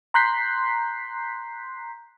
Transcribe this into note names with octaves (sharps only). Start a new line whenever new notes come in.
A#5 C6 F#6 G6 B6 C7